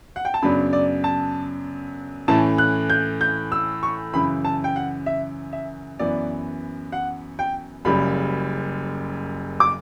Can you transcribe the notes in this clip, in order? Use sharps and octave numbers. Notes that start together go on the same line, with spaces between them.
F#5
G5
A5
F#2 C#3 F#3 B3 D4 B5
D5
A5
A2 E3 A3 C#4 A5
F#6
G6
G6
E6
C#6
F#2 C#3 E3 B5
A5
G5
F#5
E5
E5
F#2 E3 B3 D5
F#5
G5
F#1 F#2 C#3 G3 B5
D6